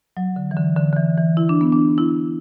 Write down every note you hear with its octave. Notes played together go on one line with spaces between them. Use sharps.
F#3
D3
E3
D3
D3
D3
E3
E3
E4
D4
B3
D4
E4